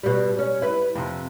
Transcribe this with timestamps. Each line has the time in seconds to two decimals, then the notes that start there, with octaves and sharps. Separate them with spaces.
0.03 B2 G3
0.39 C#4
0.62 E4 B4
0.95 F2 C3